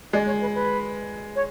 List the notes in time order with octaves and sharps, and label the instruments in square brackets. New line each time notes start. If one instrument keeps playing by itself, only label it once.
[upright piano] G#3 [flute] D5
[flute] C#5
B4
B4
C#5